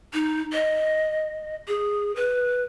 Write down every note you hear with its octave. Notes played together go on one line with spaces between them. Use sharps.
D#4
D#5
G#4
B4